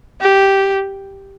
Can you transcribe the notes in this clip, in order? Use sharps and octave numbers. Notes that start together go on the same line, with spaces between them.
G4